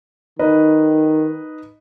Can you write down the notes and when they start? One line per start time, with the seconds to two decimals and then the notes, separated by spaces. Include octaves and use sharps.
0.39 D#3 D#4 B4 D#5